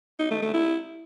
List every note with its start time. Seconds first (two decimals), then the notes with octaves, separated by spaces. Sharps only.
0.19 D#4
0.31 A3
0.42 A3
0.53 E4